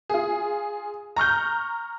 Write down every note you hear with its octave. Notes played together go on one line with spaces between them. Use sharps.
F4 G#4
A#5 C#6 F6 G6